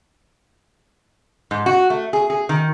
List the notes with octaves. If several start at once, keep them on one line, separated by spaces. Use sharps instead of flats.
G#2
F#4
A3
G#4
G#4
D#3